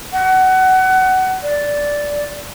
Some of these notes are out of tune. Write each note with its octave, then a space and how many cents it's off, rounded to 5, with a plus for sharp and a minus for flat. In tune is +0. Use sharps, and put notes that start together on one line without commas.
F#5 +20
D5 -10